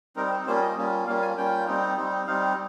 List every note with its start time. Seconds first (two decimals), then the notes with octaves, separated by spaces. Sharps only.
0.16 G3 C4 D#4 A#4
0.32 C5
0.46 G3 A#3 C#4 F4 C5
0.61 D#5
0.77 G3 A#3 C#4 F4
1.07 G3 A#3 C#4 F4 F5
1.22 G#5
1.37 G3 A#3 C#4 F4 G5
1.67 G3 C4 D#4
1.97 G3 C4 D#4
2.27 G3 C4 D#4 F5